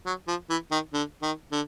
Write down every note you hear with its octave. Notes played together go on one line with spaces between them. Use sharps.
F#3
F3
E3
D#3
D3
D#3
D3